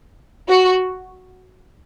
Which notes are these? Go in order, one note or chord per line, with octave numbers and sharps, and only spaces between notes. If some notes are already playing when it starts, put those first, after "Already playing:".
F#4